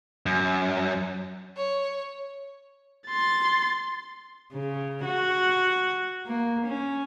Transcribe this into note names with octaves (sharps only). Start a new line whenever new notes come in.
F#2
C#5
C6 A6
C#3
F#4
A#3
C#4